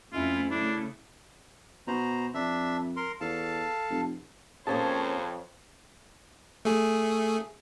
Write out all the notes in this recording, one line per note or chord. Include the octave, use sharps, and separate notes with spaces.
F2 A3 C#4 E4 F4
C#3 A3 D4 E4
B2 C5 A#5
F2 D4 E5
A#4 C6
E2 A4 F5 A5
F1
F2 A#3 C#4 G#4 C5 C#5 A5
A3 G#4